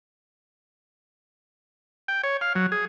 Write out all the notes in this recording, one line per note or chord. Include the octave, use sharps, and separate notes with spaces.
G5
C#5
F5
F#3
G#4